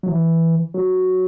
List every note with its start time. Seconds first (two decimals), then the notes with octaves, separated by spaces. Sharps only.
0.03 F#3
0.09 E3
0.74 F#3